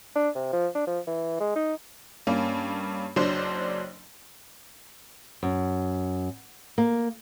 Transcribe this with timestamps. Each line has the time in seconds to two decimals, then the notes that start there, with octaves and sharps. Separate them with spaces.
0.16 D4
0.35 C3
0.53 F3
0.75 D4
0.87 F3
1.07 E3
1.40 G#3
1.56 D#4
2.27 G2 A#3 C#4
3.16 F#1 F#3 D4 C5 C6
5.43 F#2
6.78 A#3